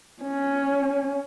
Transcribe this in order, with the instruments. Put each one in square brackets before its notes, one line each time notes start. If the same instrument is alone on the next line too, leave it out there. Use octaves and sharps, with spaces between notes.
[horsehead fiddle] C#4